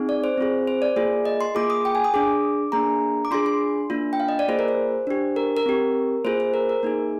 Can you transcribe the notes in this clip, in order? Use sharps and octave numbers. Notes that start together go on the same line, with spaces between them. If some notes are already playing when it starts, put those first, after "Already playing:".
Already playing: C4 D#4 G#4
D5
C5
C4 F4 G#4
C5
D5
A#3 F4 G#4
D#5
C6
A#3 F4 G#4 D6
D#6
G5
G#5
D#6
D4 G#4 D6
A#3 D4 G#4 A#5
D6
D4 F4 G#4 C6
C6
A#3 D4 F4
G5
F5
D#5
D5
A#3 F4 G#4 C5
A#4
C5
D4 G4
A#4
A#4
C4 G4
A#3 F4 G#4 C5
C5
A#4
A#4
A#3 D#4 G#4